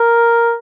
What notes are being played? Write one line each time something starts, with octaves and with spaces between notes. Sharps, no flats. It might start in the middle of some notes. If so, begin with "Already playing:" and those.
Already playing: A#4